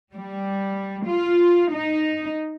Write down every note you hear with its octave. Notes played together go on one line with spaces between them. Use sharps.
G3
F4
D#4